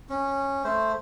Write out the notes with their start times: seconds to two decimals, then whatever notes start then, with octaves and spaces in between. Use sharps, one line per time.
0.10 C#4
0.64 A3 C5